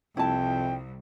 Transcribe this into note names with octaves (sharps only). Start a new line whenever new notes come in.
C2 F2 E4 G5 A5